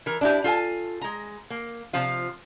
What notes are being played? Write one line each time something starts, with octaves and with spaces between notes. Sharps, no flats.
E3 A#4
D4 E4 G4
F4 A4 F#5 G#5 A5
G#3 A#5
A#3
C3 F3 F4